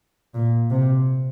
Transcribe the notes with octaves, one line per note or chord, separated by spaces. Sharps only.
A#2
C3